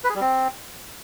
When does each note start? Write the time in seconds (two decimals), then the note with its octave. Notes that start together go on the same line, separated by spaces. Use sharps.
0.04 B4
0.10 G#4
0.15 G3
0.21 C4